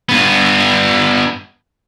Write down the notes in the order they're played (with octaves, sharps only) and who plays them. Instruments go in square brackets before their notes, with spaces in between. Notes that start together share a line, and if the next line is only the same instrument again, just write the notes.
[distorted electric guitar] G2 B3